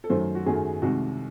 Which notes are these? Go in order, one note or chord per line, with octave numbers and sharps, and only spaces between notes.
A4
F#2 D#3 F#3 A3 C5
F#4
F#2 D#3 F#3 A3 G#4
C2 C3 D#3 G#3 F#4